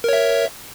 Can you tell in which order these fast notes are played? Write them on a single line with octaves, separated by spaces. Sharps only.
A#4 C#5 E5